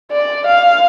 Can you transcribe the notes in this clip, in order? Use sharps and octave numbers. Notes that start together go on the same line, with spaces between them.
D5
F5